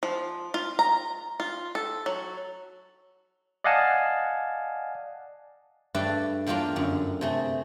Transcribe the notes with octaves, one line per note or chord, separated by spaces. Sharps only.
F3
F4
A#5
F4
A4
F#3
D5 D#5 F5 F#5 G#5 A5
G2 A3 D4 A4 B4 D5
E2 G3 A#3 D4 F4
F#2 D3
C3 A3 G#4